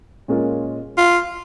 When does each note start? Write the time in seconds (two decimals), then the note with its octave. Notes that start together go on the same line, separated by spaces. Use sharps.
0.28 A#2 G#3 C#4 F4 A#4
0.98 F4